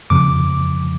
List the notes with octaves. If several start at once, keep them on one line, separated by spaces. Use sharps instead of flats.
F2 C#3 F3 D6